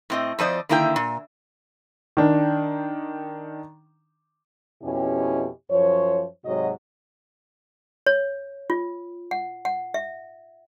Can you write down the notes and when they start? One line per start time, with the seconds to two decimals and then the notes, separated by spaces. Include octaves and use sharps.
0.10 A2 C4 D#5
0.39 F2 F3 C5 D5 D#5
0.69 D3 D#3 A#3 E4 G#4 G5
0.96 A#2
2.17 D#3 D4
4.83 F2 B2 C#4 E4 G4
5.70 F#2 F3 C5 C#5
6.45 G#2 C3 F#3 F#4 C#5 D#5
8.06 C#5
8.70 F4
9.31 F#5
9.65 F#5
9.94 E5